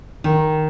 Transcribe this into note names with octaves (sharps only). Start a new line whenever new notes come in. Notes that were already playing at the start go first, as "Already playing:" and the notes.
D#3